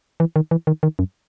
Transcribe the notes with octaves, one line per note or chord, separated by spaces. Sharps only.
E3
D#3
E3
D#3
D#3
F#2